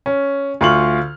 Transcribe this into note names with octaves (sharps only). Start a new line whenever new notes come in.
C#4
D2 F4 C6 C#6 F6 F#7